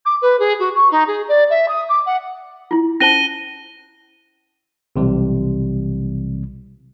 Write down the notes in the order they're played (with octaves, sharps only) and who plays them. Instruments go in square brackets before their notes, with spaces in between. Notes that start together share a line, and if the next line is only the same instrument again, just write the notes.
[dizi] D6
B4
G#4
F#4
C#6
D#4
G#4
D5
E5
D#6
D6
F#5
[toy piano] E4 F4
[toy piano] C#4 C5 A5 [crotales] A#6 D#7 G7
[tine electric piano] B1 C3 E3 G3